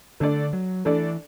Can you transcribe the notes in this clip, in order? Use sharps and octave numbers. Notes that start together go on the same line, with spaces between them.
D3 A3 D4 A4 D5
F#3
E3 A3 D4 A4 D5